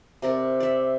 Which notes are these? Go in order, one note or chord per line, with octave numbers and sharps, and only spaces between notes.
C3 A#4 D5
D5 E5